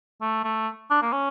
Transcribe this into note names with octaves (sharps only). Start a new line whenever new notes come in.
A3
A3
D4
A#3
C#4